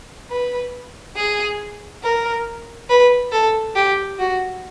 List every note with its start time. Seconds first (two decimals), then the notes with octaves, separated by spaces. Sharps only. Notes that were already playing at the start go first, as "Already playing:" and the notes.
0.30 B4
1.16 G#4
2.03 A#4
2.89 B4
3.32 A4
3.75 G4
4.19 F#4